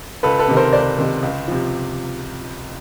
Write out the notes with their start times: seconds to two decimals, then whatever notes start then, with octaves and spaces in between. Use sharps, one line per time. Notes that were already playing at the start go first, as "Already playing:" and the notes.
0.23 C#2 A4 B4
0.39 A4 B4
0.48 C3 D#3
0.57 A#4 C5
0.73 C#2 C5 D5
0.98 C3 D#3
1.23 C#2
1.48 C3 F3